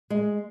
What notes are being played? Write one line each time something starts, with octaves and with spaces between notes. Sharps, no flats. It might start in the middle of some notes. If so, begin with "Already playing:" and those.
G#3